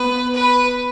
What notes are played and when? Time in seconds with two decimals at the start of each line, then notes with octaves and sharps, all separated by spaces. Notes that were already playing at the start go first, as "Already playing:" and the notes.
Already playing: B3 B4
0.34 B4